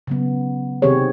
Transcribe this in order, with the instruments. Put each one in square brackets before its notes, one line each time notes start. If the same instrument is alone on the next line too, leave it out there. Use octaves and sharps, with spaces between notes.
[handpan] C#3 F#3 B3
C3 D#3 C4 G4 G#4 C#5